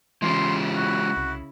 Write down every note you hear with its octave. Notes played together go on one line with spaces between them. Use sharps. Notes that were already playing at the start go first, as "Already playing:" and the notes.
C#3 E3 G#3 E4 F4 G4 C6
F#4
C2